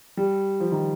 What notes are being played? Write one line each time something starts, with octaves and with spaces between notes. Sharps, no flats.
G3
F3
D#3